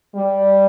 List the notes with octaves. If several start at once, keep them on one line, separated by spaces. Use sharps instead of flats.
G3